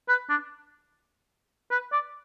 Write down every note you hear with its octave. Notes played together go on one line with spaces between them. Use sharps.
B4
D4
B4
D5